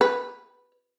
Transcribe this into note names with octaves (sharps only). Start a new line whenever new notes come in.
B4